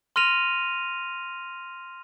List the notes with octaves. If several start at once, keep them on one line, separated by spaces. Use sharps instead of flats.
C6 F6 A#6 D#7 F7